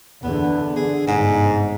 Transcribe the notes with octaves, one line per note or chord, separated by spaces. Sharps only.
E2 D3 B3
D3 G#4
G1 G#2 C3